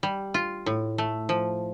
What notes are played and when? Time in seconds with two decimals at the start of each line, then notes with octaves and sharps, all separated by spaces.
0.03 G3
0.34 F4
0.66 A2
0.98 A3
1.29 F3